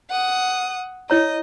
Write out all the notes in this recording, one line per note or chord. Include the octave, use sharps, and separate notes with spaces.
F#5 D#6
E4 C#5 D#5 A#5